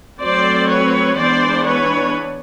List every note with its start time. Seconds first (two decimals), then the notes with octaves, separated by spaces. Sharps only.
0.20 F#3 A3 C4 C5 D5
0.69 B4 C#5
1.17 E3 G#3 B3 D4 C5 D5
1.65 B4 C#5